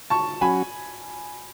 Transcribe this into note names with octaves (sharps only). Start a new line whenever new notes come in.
A5 C#6
F#3 C#4 F#4 G#5 B5